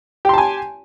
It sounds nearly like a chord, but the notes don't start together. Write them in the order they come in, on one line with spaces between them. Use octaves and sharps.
G4 C6 A5 G#5